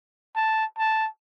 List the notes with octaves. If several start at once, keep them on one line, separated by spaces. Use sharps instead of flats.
A5
A5